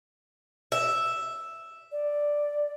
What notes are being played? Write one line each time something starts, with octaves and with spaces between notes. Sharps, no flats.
E5
D5